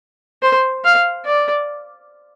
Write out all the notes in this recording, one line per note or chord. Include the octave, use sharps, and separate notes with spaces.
C5
F5
D5